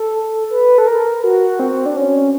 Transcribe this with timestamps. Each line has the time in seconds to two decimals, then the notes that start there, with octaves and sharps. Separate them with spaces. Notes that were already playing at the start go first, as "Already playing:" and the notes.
Already playing: A4
0.50 B4
0.78 A4
0.87 A#4
1.24 F#4
1.60 C4
1.86 D4
1.97 C#4